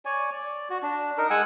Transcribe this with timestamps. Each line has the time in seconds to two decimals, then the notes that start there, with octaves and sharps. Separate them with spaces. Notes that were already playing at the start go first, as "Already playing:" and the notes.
0.05 C#5 D5 G#5
0.31 D5
0.70 F#4
0.83 D4
1.18 D#4 A#4
1.30 G#3 F#5 G#5 E6